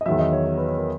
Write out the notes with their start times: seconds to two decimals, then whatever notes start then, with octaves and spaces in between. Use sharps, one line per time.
0.01 D#5
0.06 E2 D#3 F#3 E5
0.19 D#5
0.33 C#5
0.47 C#5
0.57 B4
0.68 C#5
0.77 A#4